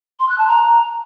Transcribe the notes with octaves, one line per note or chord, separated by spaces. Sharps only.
C6
F#6
A5
A#5